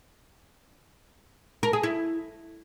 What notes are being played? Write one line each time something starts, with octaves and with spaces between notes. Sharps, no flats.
A#4
G#4
E4